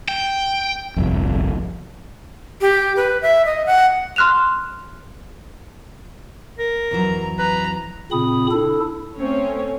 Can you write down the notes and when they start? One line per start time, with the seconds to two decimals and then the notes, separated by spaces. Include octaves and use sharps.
0.08 G5
0.96 G1 C2 F2
2.61 G4
2.96 B4
3.22 E5
3.45 D#5
3.66 F#5
4.16 C6 F6 F#6 E7 F7
6.59 A#4
6.91 F2 E3 F#3 A#5
7.39 B4 A#5
8.12 A#2 C#3 C4 B5 D#6
8.51 D4 E4 A4
9.16 A3 C4 C#4 C#5